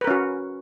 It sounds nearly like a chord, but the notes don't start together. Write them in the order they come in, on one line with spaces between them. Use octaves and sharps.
B4 A#4 C#4 F#4